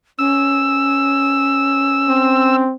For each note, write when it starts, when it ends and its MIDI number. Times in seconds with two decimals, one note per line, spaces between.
0.19 2.65 61
0.19 2.56 88
2.09 2.74 60